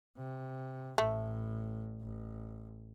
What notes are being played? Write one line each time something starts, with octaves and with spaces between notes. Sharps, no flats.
C3
A1 A2 A3
A1